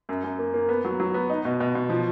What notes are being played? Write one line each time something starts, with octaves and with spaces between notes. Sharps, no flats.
F#2
F#2
A#3
A#3
B3
F#3
F#3
B3
D#4
B2
B2
B2
F3